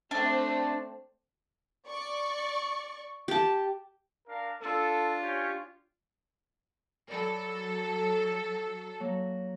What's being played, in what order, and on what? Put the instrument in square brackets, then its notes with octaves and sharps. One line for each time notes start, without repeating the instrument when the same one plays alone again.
[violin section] A3 C4 [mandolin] D4
[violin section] D5 C#6
[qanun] G4 A5
[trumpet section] D4 A#4 F5
[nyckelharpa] D4 F4 [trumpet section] A4
[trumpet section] C#4 G4 C#5
[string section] F#3 A4 [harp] A#4 D5 B5
[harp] F#3 A#3